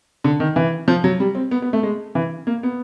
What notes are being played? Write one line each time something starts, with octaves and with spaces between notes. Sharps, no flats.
D3
D#3
E3
F3
F#3
G3
C4
B3
B3
A3
G#3
E3
A#3
B3